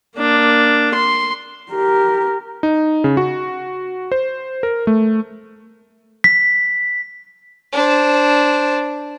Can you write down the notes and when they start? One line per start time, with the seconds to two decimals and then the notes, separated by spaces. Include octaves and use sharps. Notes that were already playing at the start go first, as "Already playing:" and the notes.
0.16 A#3 D4
0.95 C6
1.71 G4 A#4
2.63 D#4
3.04 C#3
3.17 F#4
4.12 C5
4.63 A#4
4.87 A3
6.24 B6
7.73 D4 C5